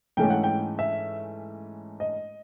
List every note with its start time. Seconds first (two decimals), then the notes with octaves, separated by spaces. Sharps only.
0.17 G#2 E3 A3 C#4 G5
0.30 F#5
0.44 G5
0.79 E5
2.00 D#5